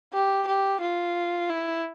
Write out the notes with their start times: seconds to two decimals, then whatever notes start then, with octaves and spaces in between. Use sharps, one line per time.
0.13 G4
0.47 G4
0.81 F4
1.49 E4